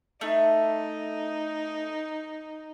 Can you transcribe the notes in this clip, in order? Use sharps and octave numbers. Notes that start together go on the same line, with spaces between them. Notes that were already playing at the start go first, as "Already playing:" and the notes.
A3 D#4